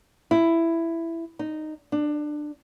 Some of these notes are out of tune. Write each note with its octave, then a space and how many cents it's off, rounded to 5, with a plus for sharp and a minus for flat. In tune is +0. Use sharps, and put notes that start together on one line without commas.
E4 +10
D#4 -10
D4 +20